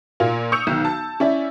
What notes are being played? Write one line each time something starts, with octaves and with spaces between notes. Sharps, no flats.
A#2 A#3 F4
C#6 D#6 E6 G6 C#7 F7
B1 D#3
A5
C#4 E4 D5 E5